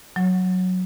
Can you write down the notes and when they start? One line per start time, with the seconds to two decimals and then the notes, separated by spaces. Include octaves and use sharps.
0.16 F#3